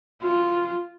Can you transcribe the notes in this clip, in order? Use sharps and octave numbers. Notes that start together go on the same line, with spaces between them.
F4